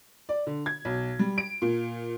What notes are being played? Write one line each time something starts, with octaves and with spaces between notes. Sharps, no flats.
D5
D3
G#6
B1
G3
D7
A#2